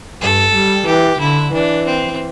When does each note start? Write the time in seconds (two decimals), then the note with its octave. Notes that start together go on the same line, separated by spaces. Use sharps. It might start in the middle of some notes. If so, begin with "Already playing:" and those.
0.21 G2 A4
0.54 G3
0.87 E3 G4
1.20 D3 E4
1.53 E3 D4
1.86 C4